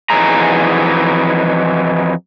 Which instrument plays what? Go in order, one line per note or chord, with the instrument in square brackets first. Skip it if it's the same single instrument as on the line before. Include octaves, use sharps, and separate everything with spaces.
[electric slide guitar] F2 E3 F#3 D#4 G#4 A#5